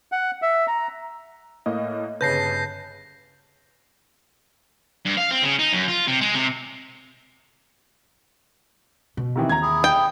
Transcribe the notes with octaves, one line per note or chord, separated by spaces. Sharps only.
F#5
E5
A#5
A2 A#3 D#5
G1 C#3 B4 A5 G6 A#6 C7
G2
F5
C4
C#3
D#4
F#2
F4
C3
G#3
C3
B2
C3 D#3 E3
D#2 A#5 G#6
E4 G#4
G5